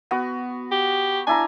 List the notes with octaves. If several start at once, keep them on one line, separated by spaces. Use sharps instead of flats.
B3 F#4
G4
D4 E4 G#5 A#5